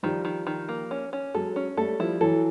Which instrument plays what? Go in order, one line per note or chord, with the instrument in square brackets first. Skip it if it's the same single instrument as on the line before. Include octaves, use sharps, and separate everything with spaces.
[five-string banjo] D#3 [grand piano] F3 G3
[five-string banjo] D#3
D#3
A#3
C#4
C#4
[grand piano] F#3 G#3 [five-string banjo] A4
[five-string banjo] C#4
[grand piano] G3 A3 [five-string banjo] A4
[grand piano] F3 G3 [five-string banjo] E4
[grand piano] E3 F#3 [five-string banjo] A4